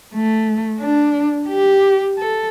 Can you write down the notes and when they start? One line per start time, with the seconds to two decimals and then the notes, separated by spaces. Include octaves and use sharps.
0.14 A3
0.81 D4
1.49 G4
2.19 A4